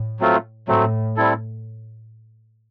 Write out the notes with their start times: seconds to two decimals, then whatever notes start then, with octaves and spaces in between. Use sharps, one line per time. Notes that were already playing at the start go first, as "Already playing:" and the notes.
Already playing: A2
0.20 F#3 A3 C4 F4
0.68 A2 F#3 A3 C4
1.16 G3 C4 E4 A4